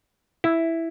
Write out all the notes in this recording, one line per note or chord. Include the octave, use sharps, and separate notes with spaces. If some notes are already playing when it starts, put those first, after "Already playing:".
E4